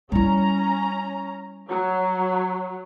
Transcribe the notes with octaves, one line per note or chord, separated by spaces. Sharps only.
G3 C#4 E4 A#5
F#3